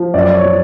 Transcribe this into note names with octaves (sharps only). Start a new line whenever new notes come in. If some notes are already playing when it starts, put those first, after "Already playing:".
Already playing: F3
F#2 D5
D5
C#5
F3